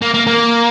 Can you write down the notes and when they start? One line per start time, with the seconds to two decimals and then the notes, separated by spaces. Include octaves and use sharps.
0.02 A#3
0.14 A#3
0.27 A#3